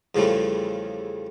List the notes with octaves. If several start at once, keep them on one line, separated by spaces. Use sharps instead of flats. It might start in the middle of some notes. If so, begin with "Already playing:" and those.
E2 C#3 F3 G3 A3